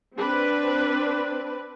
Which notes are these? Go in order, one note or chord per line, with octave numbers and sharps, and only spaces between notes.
C4 D4 B4